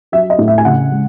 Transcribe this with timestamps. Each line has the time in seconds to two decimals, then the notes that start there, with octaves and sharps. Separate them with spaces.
0.12 F#3 E5
0.30 D#5
0.39 A2
0.48 E5
0.58 G#5
0.65 C#3 F#5
0.92 G#3